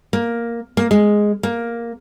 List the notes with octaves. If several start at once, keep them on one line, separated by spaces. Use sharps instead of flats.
A#3
A#3
G#3
A#3